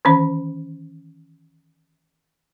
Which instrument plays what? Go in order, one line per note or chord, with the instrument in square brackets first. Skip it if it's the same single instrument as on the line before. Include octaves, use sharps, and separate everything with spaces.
[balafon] D#3 E3 C#4 B5